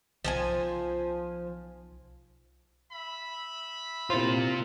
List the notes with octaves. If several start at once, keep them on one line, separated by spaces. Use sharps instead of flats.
B1 F3 C5 G#5
E5 B5
C3 A#3 E4 F4 C5